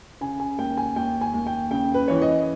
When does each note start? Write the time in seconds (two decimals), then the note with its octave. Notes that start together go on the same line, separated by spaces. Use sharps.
0.21 C#3 G#5
0.40 G#5
0.58 D#2 G5
0.77 G#5
0.96 D#2 G5
1.21 G#5
1.34 D#2
1.46 G5
1.71 C#3 G5
1.94 B4
2.08 E3 C#5
2.22 D#5